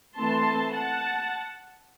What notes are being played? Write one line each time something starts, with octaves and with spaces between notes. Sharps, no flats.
E3 A3 C4 A5 C6
F#5 A5